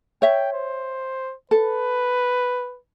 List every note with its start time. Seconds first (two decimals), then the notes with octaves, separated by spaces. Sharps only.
0.22 C#5 E5 G5
0.53 C5
1.51 A4 B4